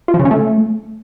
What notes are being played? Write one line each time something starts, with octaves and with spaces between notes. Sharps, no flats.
F4
F3
C#3
C#4
A3